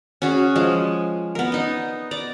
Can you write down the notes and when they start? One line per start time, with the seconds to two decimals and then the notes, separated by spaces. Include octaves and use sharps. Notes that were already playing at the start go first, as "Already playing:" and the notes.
0.22 C#4 F#4 G#4
0.56 F3 G#3
1.35 B3 A#4
1.52 D#4 D#5
2.11 D5 A#5